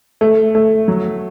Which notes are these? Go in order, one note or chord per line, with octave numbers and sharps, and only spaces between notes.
A3
A3
F#3